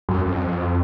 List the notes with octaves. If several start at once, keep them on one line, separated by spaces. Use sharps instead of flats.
F#2
F2